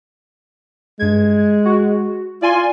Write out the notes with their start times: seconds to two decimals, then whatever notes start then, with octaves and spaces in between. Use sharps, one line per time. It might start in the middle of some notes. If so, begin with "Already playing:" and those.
0.99 G2 G#3 G#6
1.65 F#4
2.42 F4 D5 G#5 C6